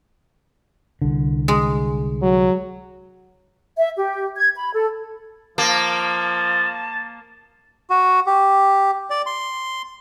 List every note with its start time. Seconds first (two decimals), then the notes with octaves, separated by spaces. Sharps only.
1.01 C2 D3
1.48 G#3
2.22 F#3
3.77 E5
3.96 G4
4.36 G#6
4.56 B5
4.73 A4
5.58 F3 A#3 A5
7.90 F#4
8.27 G4
9.10 D5
9.26 C6